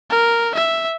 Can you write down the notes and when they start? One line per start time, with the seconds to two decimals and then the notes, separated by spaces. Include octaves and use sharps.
0.10 A#4
0.55 E5